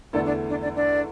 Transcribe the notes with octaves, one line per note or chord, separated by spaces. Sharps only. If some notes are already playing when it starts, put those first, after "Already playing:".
E2 D3 A3 D4 E4 A4 D5
D4 D5
D4 D5
D4 D5
D4 D5